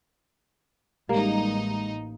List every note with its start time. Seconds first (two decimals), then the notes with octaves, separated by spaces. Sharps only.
1.09 A1 G3 G#3 A#3 D#4